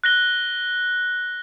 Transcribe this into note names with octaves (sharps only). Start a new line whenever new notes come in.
F#6 A#6 G7